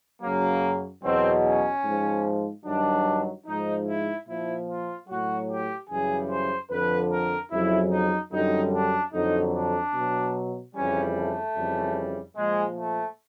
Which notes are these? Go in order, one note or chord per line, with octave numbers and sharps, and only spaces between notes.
F#2 C#3 F#3 A#3
E2 B2 F#3 C4
C#4
G#2 F3
G2 D#3 F#3 D4
G#2 F3 D#4
E4
A#2 F3 E4
F4
A2 F#3 F#4
G4
F#2 C#3 E3 G3 G#4
C5
F2 D3 F3 B4
A#4
F2 C#3 F#3 E4
D#4
F#2 D3 G3 D#4
D4
F2 D3 F#3 D#4
D4
B2 F#3
F2 C#3 E3 G3 C#4
A3
F2 C#3 E3 G3
A#2 F3 G#3
A3